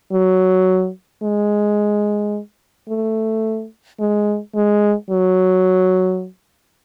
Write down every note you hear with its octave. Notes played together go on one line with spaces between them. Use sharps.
F#3
G#3
A3
G#3
G#3
F#3